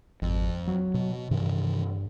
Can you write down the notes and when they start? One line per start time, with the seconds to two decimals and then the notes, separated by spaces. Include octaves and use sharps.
0.22 G#1 F2
0.68 F#3
0.94 B2
1.31 G2 C3 D#3 E3